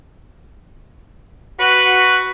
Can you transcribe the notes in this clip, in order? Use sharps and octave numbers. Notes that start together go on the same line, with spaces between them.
F#4 B4